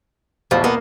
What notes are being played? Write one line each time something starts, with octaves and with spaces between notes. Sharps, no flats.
A1 E2 B2 F3
A#3 B3